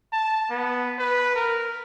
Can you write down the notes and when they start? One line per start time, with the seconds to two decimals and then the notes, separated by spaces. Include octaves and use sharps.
0.12 A5
0.50 B3
0.98 B4
1.35 A#4